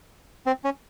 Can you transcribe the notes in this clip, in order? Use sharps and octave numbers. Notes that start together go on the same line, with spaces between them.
C4
C#4